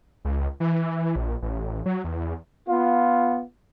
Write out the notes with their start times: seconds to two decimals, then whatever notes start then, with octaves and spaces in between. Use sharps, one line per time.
0.25 C#2
0.60 E3
1.16 A#1
1.42 A1
1.86 F#3
2.04 E2
2.69 B3 F4